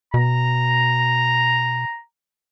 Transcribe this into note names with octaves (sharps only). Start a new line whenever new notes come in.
B2 A#5